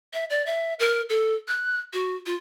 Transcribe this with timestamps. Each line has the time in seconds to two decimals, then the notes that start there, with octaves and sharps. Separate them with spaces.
0.13 E5
0.30 D5
0.46 E5
0.80 A#4
1.09 A4
1.48 F#6
1.93 F#4
2.26 F4